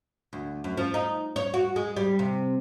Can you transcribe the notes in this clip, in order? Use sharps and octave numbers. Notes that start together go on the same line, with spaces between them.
D2
F#2
F3
D#4
C#5
F#4
G#3
G3
C3